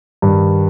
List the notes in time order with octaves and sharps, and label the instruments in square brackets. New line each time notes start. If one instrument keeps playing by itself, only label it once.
[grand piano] G2 [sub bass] D#3